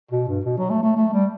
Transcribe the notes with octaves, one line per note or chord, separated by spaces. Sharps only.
B2
G2
B2
F#3
A3
A3
A3
G3